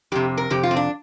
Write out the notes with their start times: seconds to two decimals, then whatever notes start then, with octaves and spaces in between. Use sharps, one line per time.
0.12 F2 C3 G4
0.37 A#4
0.50 F2 C3 G4
0.63 F4
0.71 C4
0.76 D4